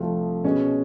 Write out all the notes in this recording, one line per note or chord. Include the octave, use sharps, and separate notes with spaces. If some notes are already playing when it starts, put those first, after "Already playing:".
Already playing: C2 C3 F3 A3
B2 G#3 C#4